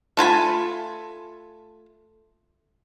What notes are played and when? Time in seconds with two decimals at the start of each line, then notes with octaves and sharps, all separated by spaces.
0.17 A3 F4 G#5 B5